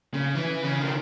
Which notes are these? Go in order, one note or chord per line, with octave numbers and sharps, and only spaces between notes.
C#3
E3
C#3
D#3